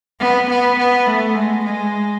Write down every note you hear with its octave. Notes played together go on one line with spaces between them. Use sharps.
B3
B3
B3
A3
G#3
G#3